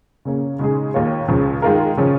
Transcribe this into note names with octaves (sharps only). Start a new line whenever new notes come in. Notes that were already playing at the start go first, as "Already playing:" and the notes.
C#3 A#3 C#4
C#3 G#3 D#4 G#4
D#2 D#3 A#3 F4 C#5
C#2 C#3 F3
D#3 G#3 F4 A#4
C#3 F3 C#4